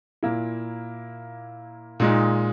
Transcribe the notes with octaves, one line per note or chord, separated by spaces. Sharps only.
A#2 A#3 E4
A#2 G#3 D#4